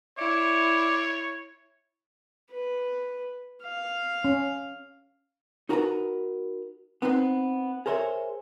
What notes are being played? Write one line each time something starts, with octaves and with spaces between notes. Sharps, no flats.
E4 C#5 D5
B4
F5
C#4
D#4 F#4 A#4 B4 F5 A#5
B3 C4 D#4 B4 C5
G#4 A#4 C5 C#5 E5